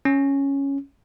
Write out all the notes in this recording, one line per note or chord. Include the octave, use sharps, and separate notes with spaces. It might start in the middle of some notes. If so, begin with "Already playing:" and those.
C#4